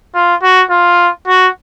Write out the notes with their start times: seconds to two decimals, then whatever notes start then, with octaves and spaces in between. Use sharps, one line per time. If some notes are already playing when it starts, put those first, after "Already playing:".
0.15 F4
0.43 F#4
0.70 F4
1.27 F#4